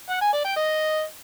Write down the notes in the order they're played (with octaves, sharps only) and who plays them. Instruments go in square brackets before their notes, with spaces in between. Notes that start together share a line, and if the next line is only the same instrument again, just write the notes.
[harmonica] F#5
G#5
D5
G5
D#5